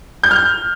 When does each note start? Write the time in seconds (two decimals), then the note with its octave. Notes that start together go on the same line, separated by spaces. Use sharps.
0.23 G6
0.31 F6